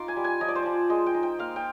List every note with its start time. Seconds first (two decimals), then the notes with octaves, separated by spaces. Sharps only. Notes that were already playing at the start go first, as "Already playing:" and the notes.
Already playing: D#4 F4 C6 D6
0.08 G#5
0.16 G3
0.24 G#5
0.41 F3 D#5
0.48 D5
0.55 C5
0.63 F3 D5
0.90 G#3 D#5
1.06 G5
1.15 D#4
1.23 G5
1.39 A#3 F5
1.56 G5